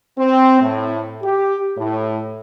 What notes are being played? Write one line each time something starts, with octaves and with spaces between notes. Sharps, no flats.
C4
A2
G4
A2